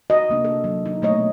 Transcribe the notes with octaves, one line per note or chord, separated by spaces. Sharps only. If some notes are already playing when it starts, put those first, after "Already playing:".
F#4 D#5
C3 A#3 D4
A4
F#3
D#4
B2 A3 A#3 C#5 D#5